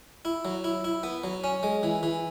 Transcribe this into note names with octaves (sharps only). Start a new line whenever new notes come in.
E4
F#3
E4
E4
B3
F#3
C#4
G#3
E3
E3